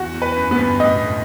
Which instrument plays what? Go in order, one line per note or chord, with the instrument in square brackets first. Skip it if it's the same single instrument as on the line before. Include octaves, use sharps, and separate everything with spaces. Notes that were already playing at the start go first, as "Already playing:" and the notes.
Already playing: [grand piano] E2 [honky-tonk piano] F#4
[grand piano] E2
[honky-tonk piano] B4
[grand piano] F#2
[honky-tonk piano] B3
[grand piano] G1 G2
[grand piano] A2 [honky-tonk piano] D#5
[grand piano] B2
A2